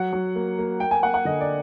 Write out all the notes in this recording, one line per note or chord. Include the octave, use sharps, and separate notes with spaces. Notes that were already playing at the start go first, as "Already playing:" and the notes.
Already playing: F#3 F#5
F#3
A#3
A#3
A#3 G5
G#5
A#3 F#5
F#5
D3 D#5
D5